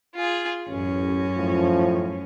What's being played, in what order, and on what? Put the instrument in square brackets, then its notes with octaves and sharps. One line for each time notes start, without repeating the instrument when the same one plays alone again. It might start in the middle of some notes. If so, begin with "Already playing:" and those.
[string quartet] F4 G#4
[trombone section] A1 [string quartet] F#2 C#4
[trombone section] A2 F3